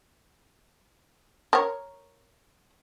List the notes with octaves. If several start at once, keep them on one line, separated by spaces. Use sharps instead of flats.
A#4 C#5